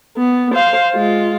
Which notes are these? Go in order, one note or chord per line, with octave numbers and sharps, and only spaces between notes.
B3
C5 F5
G#3 F4